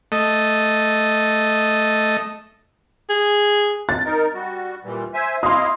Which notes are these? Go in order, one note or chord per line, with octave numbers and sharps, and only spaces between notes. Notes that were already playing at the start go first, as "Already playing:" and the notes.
A3 D#5
G#4
A6
D#4 A#4
G3 F#4
A#2 E3 G3
C5 E5 G#5
E4 D#5 F5 C6 D#6